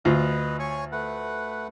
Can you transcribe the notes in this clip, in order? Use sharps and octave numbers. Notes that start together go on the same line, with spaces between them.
D2 F4 B4 D#5
C#5 G#5 C#6
A3 B4 F#5